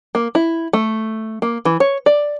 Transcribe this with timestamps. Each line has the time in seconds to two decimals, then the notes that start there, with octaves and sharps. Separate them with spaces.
0.15 A#3
0.35 E4
0.73 A3
1.42 A#3
1.65 E3
1.80 C#5
2.06 D5